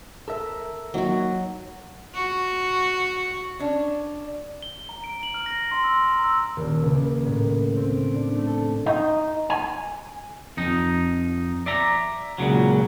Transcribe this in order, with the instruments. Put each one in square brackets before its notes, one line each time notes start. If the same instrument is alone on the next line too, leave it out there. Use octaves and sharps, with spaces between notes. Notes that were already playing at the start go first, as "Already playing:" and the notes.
[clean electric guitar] A4 A#4 E5
[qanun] F#3 F#4 [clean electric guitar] A#3 D#4
[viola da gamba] F#4
[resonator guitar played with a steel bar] C#4 D4
[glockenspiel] G7
A#5
D7
F#7
F6
A#6
C6
E6
A#5
E6
[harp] D#1
C#2
A#3
A2
C4
D7
D4
A3
A4
[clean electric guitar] D#4
G#5
F2 D#4
D5 E5 A#5
C#2 A#2 C#3 F#3